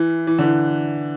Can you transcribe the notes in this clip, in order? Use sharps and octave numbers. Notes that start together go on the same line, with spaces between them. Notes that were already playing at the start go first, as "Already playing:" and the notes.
Already playing: E3
E3
D3
E3